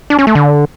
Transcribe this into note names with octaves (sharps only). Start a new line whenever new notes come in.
D4
C#4
A3
D3